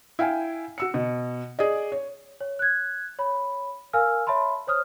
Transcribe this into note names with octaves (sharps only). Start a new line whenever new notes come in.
E4 F5 G5 G#5
F#4 E6 C#7
B2
G#4 D5 D#5
C#5
C#5
F#6 G#6
C#5 B5
A#4 F5 G#5 E6 F6
C#5 E5 A5 B5 C6
C5 C#5 D#6 F6